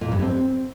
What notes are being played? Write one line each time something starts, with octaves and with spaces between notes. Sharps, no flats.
A#2
G2
C4